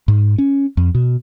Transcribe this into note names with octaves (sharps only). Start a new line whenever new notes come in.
G#2
C#4
F2
B2